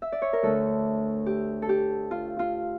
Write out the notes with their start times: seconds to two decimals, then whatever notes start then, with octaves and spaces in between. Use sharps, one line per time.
0.02 E5
0.12 D5
0.22 C#5
0.33 A#4
0.43 D2 D3 A3 A4
1.26 G4
1.62 A4
1.69 G4
2.11 F4
2.39 F4